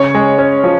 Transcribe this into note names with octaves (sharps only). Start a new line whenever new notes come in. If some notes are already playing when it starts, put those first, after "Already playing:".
Already playing: C#3 C#5
G#3
C#4
F3